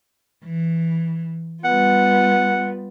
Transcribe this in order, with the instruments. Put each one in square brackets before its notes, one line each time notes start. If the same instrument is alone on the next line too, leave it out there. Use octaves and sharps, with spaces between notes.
[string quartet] E3
[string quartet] G3 B3 F4 [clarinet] F#5